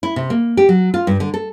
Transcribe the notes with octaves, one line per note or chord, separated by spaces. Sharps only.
E4
C3
A#3
G4
F#3
F4
G2
D3
A4